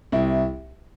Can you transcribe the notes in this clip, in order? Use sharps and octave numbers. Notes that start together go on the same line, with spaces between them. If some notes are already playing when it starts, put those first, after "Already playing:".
C2 E4